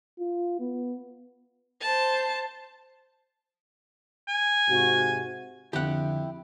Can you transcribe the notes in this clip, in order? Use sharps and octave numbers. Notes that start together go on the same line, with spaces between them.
F4
B3
C5 A5
G#5
G#2 C3 F#4
F2 D3 E4 G4 F#5 G5